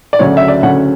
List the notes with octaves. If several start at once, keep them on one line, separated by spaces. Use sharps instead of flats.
D5
D2 C#3 F#3 C#4 C#5
E5
D5
D2 C#3 F#3 C#4 F#5